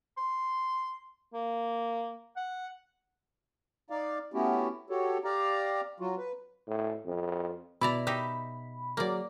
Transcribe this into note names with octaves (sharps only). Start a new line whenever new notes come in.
C6
A#3
F#5
D#4 D5 F5
A3 B3 C#4 E4 F#4 G4
F#4 G4 A4 C#5
G4 D5 F5 A#5
F#3 F4 F#4
B4
A2
F2
B2 E4 D5 A#5 B5
D#4 G4 E5
F#3 A#3 G#4 D5 A#5